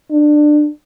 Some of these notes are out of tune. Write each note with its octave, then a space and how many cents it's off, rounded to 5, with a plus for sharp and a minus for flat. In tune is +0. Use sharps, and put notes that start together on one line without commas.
D4 +20